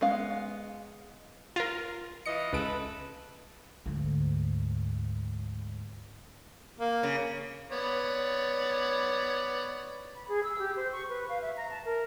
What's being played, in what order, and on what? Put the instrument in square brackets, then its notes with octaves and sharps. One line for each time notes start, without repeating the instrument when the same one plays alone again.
[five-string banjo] G#3 B3 C#4 F5
[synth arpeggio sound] F4 A#4
[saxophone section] E3 F4 D#5 [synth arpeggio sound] C#7
[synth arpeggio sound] C#2 D7 [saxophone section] A4 B4
[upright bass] D2 G#2
[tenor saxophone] A#3
[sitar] C#3
[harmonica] B3 C#5 D5
[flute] B5
G#4
E6
G4
C5
C#6
B4
F5
E5
A#5
A5
A#4